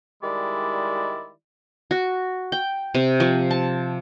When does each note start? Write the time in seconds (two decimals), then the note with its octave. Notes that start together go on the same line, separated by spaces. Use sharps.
0.23 D#3 G3 G#3 E4 D5
1.91 F#4
2.52 G5
2.94 C3
3.20 F3
3.51 A5